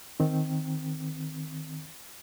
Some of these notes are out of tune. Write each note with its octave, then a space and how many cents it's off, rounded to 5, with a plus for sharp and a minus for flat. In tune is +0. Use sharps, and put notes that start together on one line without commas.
D#3 +0 C4 +0